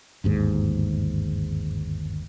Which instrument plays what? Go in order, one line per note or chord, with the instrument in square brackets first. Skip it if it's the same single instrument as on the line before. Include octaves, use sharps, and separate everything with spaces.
[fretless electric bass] G1 D#2 G#2